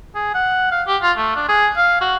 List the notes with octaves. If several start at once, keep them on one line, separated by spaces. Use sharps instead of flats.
G#4
F#5
F5
G4
F4
A3
D4
G#4
F5
F#4